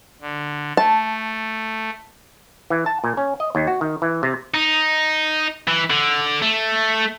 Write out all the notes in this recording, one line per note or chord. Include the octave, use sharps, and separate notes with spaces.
D3
A3 A5
E3
A5
A#2
C#4
D#5
D#2
F#4
D#3
E3
C3
D#4
E3
D3
A3